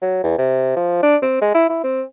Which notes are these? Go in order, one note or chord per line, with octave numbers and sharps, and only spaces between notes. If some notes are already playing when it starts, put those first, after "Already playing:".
F#3
E2
C3
F3
D4
C4
G#3
E4
E4
C4